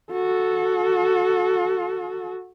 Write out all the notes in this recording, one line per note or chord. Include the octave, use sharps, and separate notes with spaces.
F#4 A4